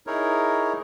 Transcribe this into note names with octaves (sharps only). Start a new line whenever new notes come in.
D#4 E4 G#4 A#4 C#5